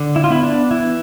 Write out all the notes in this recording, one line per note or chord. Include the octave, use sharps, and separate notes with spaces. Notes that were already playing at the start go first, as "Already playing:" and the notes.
Already playing: D3
E4
F4
B3 E4
D4
E3 E4